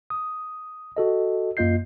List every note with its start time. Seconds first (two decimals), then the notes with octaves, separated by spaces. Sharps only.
0.10 D#6
0.97 F#4 A4 D#5
1.57 F#2 A#3 F4 D#5 G6 C7